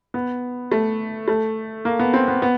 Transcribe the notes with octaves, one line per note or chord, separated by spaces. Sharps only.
B3
A3
A3
A#3
B3
C4
B3
B3